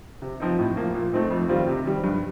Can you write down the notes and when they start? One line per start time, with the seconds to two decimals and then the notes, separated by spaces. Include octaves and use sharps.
0.22 C3
0.40 F3 C4 D#4
0.59 A2
0.76 F3 A#3
0.94 A#2
1.13 A3 C4 D#4
1.30 F2
1.49 D#3 G3 C4 F4
1.67 C3
1.85 D#3 G3
2.04 G2